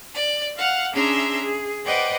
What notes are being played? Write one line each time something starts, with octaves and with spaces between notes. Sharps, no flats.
D5
F5 F#5 F6
C#4 D4 G#4 E5 A#5 C6
G#4
B4 C5 D5 D#5 F#5 G5